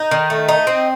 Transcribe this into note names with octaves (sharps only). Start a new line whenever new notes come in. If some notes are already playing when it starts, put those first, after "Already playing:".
Already playing: D#4
D#3
A3
D#4
C4